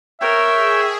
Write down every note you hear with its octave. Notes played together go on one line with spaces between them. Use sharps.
A#4 C#5 E5 G5
G#4